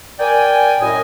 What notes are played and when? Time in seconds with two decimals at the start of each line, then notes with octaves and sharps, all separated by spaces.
0.19 A#4 D5 G5 G#5
0.80 F#2 A2 D#5 G#5